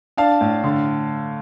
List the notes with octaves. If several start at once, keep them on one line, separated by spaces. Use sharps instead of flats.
D4 F5 A5
A2
D3